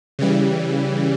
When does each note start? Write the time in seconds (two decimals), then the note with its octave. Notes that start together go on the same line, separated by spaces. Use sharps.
0.19 C#3 E3 G3